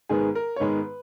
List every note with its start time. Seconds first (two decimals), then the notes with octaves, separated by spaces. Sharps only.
0.09 G#2 D#3 G#3 B3 G#4
0.35 A#4
0.56 C#5
0.60 G#2 D#3 G#3 B3 B4